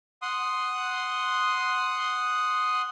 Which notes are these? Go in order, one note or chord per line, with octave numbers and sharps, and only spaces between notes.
F#5 C6 D#6